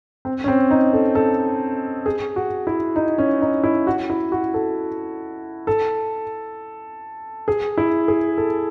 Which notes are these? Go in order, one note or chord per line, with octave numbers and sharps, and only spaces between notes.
C4
C#4
C4
D#4
A4
A4
G#4
F#4
E4
D#4
C#4
D#4
E4
F#4
E4
F#4
A4
A4
G#4
E4
G#4
A4